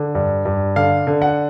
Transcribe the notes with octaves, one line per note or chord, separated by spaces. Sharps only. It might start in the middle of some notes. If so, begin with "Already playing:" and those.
Already playing: D3
G2
G2
D3 F5
D3
F#5